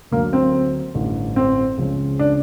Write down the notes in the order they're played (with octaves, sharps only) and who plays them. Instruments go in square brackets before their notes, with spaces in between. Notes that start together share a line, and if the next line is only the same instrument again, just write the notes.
[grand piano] D2 D3 F#3 [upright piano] A#3
[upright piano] C4
[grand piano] A1 G2 D3
[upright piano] C4
[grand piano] C#2 C#3 F3 G#3 C#4
[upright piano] D4